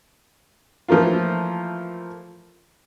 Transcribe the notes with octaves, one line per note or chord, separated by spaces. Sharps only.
E3 F3 A3 A#3 F4